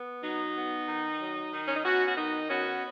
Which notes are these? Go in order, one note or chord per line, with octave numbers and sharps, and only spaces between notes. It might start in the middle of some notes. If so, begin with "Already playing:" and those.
Already playing: B3
F#3 D#4
B3
D#3
F#3
D#3
C#4
D#4
B3 C#4 F#4
F#4
D#3 D#4
B3 C#4 F#4